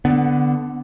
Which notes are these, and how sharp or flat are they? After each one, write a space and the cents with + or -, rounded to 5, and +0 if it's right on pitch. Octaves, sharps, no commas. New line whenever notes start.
D3 +0 B3 +15